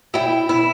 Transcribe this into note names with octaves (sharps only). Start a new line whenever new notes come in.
E4 G5
E4